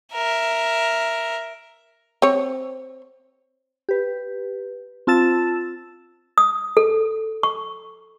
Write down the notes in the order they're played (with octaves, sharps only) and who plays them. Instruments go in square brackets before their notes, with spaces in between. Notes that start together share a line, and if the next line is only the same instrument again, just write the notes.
[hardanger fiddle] A#4 E5
[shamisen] C4 C#5
[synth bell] G4 B4
C4 F4 A5 E6 A6 E7
[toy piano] D#6
A4
C#6